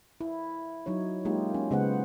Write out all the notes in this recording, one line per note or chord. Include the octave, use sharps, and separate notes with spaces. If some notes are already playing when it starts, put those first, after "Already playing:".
E4
F#3 D#4 E4 C#5
G#3 A#3 D#4 F4 G4
C#4
C#3 G#3 B3 C5 F#5